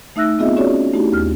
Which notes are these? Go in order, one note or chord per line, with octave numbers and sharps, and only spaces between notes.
A3 D#4 E5 E6 F#6 A#6
B3 C4 F4 G#4 D#5 E5
C#4 F#4 G#4 C#5 D5
C#4
A3 D#4 E4 F#4 G4
D#2 F6